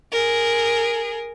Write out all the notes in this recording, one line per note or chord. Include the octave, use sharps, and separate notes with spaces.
G#4 A#4